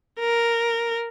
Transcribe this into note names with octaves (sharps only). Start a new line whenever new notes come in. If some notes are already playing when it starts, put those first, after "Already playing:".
A#4